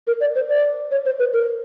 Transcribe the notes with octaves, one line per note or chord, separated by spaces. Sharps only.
A#4
D5
C5
D5
C#5
C5
B4
A#4